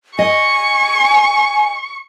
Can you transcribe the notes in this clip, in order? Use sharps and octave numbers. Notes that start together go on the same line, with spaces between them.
D#5 G#5 C#6